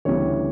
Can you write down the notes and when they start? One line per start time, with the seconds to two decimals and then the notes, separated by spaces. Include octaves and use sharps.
0.05 D2 C#3 E3 G3 B3 C#5